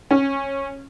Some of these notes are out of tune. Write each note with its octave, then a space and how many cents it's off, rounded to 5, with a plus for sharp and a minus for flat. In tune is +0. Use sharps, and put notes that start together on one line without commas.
C#4 -20